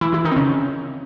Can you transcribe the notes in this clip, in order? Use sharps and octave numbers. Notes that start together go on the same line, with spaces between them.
E3 E4
E3 E4
D#3 D#4
C4
C#3 C#4